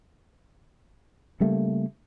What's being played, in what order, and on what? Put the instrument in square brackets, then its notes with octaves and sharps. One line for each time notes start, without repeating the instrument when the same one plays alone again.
[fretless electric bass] C#3 G3 A3 A#3